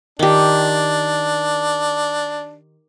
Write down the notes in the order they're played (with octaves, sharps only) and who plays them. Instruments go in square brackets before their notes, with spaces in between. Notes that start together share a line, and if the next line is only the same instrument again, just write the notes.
[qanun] D#3 G4 [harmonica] D4